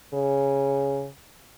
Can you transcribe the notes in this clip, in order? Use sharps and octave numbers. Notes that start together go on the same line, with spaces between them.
C#3